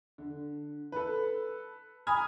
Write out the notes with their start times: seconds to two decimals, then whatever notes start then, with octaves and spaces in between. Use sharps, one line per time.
0.18 D3
0.92 A4 B4
2.07 G#5 A#5 B5 D#6 F6 G#6